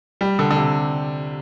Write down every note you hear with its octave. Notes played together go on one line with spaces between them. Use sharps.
G3
D3
D3
C3